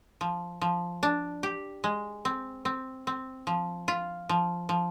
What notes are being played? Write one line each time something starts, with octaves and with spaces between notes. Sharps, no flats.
F3
F3
D4
G4
G#3
C4
C4
C4
F3
F4
F3
F3